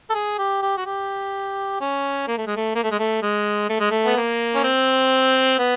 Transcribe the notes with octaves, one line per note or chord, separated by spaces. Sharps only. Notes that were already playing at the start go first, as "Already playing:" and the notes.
A4
G#4
G4
G4
F#4
G4
C#4
A#3
A3
G#3
A3
A#3
A3
G#3
A3
G#3
A3
G#3
A3
B3
A#3
C#4
C4
B3